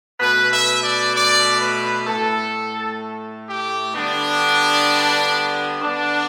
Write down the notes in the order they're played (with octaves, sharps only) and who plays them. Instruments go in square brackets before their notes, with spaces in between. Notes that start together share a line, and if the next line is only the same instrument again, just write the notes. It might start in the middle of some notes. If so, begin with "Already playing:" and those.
[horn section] B2 A3 B4
E5
D5
D5
B4
A2 A3 A4
G4
D3 G3 B3 D4
D3 B3 D4